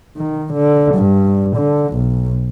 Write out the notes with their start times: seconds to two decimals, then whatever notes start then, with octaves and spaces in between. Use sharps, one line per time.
0.17 D#3
0.54 D3
0.95 G2
1.56 D3
1.94 B1